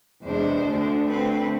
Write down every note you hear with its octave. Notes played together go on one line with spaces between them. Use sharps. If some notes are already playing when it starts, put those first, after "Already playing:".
E2 C3 G#3 D4 C5
D2 D3 A3 D4
D3 A3 C4 B4